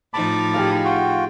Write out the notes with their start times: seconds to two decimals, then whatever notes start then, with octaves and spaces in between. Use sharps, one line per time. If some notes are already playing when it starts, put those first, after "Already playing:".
0.14 A2 F3 D#4 A5 B5 D6
0.54 G4 G#4 F5
0.84 F4 F#4 G5